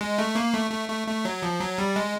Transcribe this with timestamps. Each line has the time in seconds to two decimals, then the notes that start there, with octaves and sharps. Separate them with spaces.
0.01 G#3
0.18 A3
0.35 A#3
0.54 A3
0.71 A3
0.89 A3
1.07 A3
1.25 F#3
1.42 F3
1.60 F#3
1.78 G3
1.96 G#3